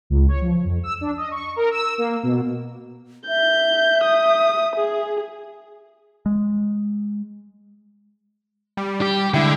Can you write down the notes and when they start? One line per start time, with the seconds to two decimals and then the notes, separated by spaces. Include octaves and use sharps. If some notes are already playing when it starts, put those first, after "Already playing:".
0.10 C#2
0.29 C#5
0.41 F3
0.64 F2
0.83 E6
1.01 D4
1.17 D#5
1.31 C#6
1.56 A#4
1.71 E6
1.98 A#3
2.23 B2
3.28 E5 G6
4.05 D#6
4.76 G#4
6.26 G#3
8.77 G3
9.02 G4
9.34 D3 G#3 E4 G5